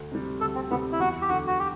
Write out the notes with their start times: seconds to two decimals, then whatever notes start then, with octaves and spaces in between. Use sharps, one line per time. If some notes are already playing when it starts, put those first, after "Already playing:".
Already playing: D2
0.12 C3 G3
0.41 D2 A4
0.55 C4
0.71 C3 G3 B3
0.92 E4
0.99 E2 F#4
1.22 G4
1.29 D3 F#3 F#4
1.47 F#4
1.59 G4